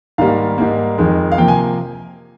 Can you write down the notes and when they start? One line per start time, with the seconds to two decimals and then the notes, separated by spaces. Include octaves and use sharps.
0.18 G#2 D#3 G3 A#3 F5
0.58 G#2 G3 A#3
0.98 F2 D#3 G#3
1.32 F5
1.38 C3 F3 A#3 G5
1.48 G#5